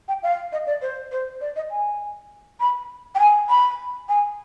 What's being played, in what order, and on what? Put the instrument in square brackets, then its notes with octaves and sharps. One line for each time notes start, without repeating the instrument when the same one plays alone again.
[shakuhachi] G5
F5
D#5
D5
C5
C5
D5
D#5
G#5
B5
G5
G#5
B5
G#5